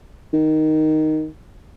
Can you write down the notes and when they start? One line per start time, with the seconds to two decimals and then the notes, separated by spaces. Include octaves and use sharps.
0.33 D#3